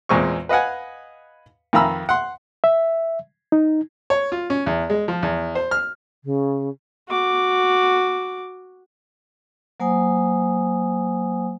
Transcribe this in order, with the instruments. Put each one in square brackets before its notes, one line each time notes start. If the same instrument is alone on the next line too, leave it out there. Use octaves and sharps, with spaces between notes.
[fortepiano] E2 A#2 G#3 C4 C#6
B4 D#5 F5 F#5 G#5
F2 D#3 F5 A#5 B5 E6
F#5 C6
[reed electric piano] E5
D#4
[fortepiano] C#5
F4
C#4
E2
G#3
F3
E2
C5
F6
[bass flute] C#3
[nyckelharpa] F#4 D6
[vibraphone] F#3 A#3 C5 F#5 G#5 D#6